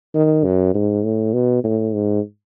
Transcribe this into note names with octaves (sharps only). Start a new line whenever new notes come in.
D#3
F#2
G#2
A2
B2
A2
G#2